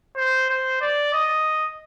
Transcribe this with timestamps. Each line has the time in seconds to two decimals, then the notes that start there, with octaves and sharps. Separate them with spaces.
0.16 C5
0.49 C5
0.81 D5
1.13 D#5